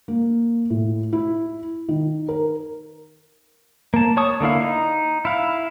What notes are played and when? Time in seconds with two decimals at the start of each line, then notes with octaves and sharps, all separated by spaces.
0.08 A#3
0.70 A2
1.13 E4
1.89 D#3
2.29 A#4
3.94 A#3 A5
4.17 C#5 A5 C#6 D#6
4.40 D3 A#3 E4 F5
4.60 D#4
5.25 E4 F5